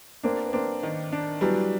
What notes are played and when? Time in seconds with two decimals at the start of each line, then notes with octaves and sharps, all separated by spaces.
0.23 A#3 C4 D4
0.46 B3
0.53 A#3 C4 D4
0.83 D#3
1.12 D4
1.41 E3 F#3 G3